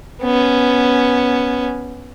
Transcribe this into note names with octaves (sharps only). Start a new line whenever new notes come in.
B3 C#4